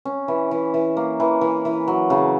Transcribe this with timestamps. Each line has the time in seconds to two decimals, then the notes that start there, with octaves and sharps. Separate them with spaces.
0.05 C#4
0.28 E3
0.51 E3
0.74 E3
0.97 A#3
1.20 E3
1.41 E3
1.65 E3
1.88 F#3
2.10 C#3